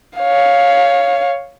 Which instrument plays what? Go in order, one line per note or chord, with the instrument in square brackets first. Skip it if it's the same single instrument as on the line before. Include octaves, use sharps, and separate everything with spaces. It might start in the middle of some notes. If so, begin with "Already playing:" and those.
[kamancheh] C#5 F5